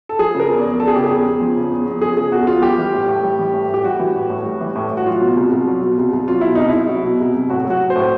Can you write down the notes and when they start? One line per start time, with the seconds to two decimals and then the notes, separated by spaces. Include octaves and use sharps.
0.09 A4
0.19 F3 G#4
0.34 C#3
0.40 A#4
0.49 E2
0.59 E2 D5
0.80 F3 A4
0.88 G#4
0.96 C#3 G4
1.04 G#4
1.10 E2
1.26 E2
1.41 F3
1.56 C#3
1.71 E2
1.86 E2
2.01 F3 G#4
2.17 C#3 G#4
2.32 E2 F#4
2.47 E2 F4
2.62 G3 G4
2.78 E3
2.93 A2
3.08 A2
3.23 G3
3.39 E3
3.54 A2
3.69 A2 G4
3.84 G3 F#4
3.99 E3
4.15 A2
4.30 A2
4.45 G3
4.61 E3
4.76 A2
4.91 A2
4.97 F#4
5.06 F#3 F4
5.21 B2
5.37 C2
5.51 C2
5.68 F#3
5.83 B2
5.98 C2
6.13 C2
6.28 F#3 F4
6.41 B2 E4
6.55 C2 D#4
6.69 C2 E4
6.89 F#3
7.04 B2
7.20 C2
7.34 C2
7.50 A2 F#4
7.65 F#3
7.70 F#4
7.80 F#3
7.90 C5
7.96 A2